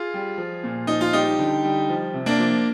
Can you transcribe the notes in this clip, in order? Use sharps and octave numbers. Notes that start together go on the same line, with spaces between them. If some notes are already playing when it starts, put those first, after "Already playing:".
Already playing: F4 G#4
G3
F3
A#2
F3 D#4
F4
G3 D#4 G4
D3
G3
F3
C3
A#3 D4
F3